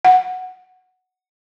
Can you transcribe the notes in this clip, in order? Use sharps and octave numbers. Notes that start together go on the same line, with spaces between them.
F#5